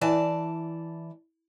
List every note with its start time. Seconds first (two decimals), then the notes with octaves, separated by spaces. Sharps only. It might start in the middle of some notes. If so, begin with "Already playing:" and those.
0.01 E3 D5 A5